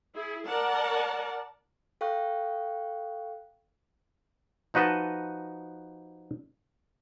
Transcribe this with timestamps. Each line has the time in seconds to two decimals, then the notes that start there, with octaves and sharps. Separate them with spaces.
0.13 E4 G#4
0.46 A#4 D5 F#5 A5
2.01 A4 F5 G5 C#6 F#6
4.74 F3 D#4 F#4 B4 D#5 A5